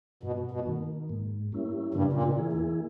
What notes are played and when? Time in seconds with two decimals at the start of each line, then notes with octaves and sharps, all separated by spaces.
0.23 G2 B2
0.51 B2
0.66 D#3 A#3
1.10 G#2
1.52 G3 A#3 C#4 E4
1.94 G2 C#3
2.13 A#2
2.23 G#2
2.38 E3 A#3 E4 G#4
2.53 E2